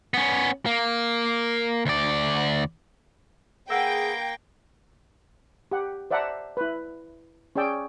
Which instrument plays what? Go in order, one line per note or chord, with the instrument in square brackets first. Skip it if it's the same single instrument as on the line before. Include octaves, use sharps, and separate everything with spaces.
[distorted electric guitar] B3 C#4
A#3
D2 D5
[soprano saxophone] A#3 [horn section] G#4 [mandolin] B4 F#5 E6 [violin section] G5
[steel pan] G4 F#5
C5 D5 E5 F#5 A5 A#5
E4 B4
C#4 G#4 D5 G5 E6